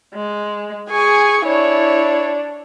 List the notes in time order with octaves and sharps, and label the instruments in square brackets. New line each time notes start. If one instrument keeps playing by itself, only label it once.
[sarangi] G#3
[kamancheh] G#4 C#6 [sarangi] G#5
[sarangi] D4 [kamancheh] E4 C#5